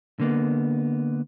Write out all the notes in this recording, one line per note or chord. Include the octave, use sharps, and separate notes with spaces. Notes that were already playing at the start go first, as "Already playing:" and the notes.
D3 A#3 B3